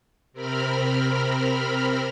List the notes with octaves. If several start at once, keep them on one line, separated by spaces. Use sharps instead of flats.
C3 C4 A#4 B5 F6